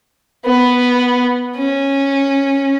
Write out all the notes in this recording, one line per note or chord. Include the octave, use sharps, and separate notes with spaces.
B3
C#4